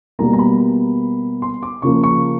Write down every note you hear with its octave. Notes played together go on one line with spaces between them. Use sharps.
B2 G3 A#3 A#5
A#5
B5
C6
D6
C#3 F3 A#3 C#6
C#6